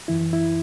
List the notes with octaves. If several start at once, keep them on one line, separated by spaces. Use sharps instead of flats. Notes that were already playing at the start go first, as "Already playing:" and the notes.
F#2 E3 E4
E4